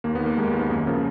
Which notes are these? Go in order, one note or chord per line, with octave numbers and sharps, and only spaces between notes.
D#2 A#3
B3
D#3
A#3
D#2 G#3
D#3
B3
F#2 A#3
C#3 F3